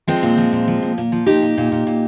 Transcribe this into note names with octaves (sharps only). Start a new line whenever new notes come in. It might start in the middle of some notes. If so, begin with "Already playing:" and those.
F3 G#3 C4
A#2
F3
A#2
F3
A#2
A#2
F3
A#2 D#4 G4
A#2
A#2
A#2
A#2